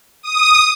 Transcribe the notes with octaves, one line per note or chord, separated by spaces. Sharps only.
D#6